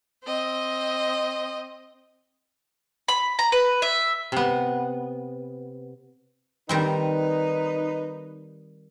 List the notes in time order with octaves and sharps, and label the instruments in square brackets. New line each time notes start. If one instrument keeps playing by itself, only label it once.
[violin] C4 D#5
[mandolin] B5
A#5
B4
E5
[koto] C3 B3
[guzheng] D#3 G3 C4 [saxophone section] D#4 B4